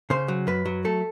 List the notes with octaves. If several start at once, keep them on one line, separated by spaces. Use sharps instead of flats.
C#3 C5
F#3
F#2 B4
F#3
A3 A4